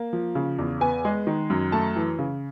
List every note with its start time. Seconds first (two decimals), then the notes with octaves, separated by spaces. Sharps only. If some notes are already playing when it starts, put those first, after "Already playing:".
Already playing: A#3
0.13 F3
0.35 C#3
0.59 E2
0.81 B3 G#5
1.05 G#3
1.27 D#3
1.50 F#2
1.72 A3 A5
1.96 E3
2.19 C#3